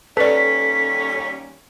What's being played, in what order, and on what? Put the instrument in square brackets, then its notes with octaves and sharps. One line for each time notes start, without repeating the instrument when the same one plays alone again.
[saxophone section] D#2 G3 C#4 [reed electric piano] A4 [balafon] B4 D5 [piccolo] B6